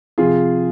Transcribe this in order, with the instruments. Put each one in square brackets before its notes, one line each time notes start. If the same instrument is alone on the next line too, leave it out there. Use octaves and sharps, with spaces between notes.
[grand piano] C3 F3 F4 G#4